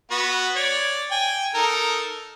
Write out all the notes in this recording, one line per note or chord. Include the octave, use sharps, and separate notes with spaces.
B3 F#4 B4
C#5 D5
G5 G#5
D#4 A4 A#4